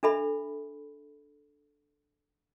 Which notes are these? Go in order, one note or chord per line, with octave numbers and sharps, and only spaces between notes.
D4 A4 E5 B5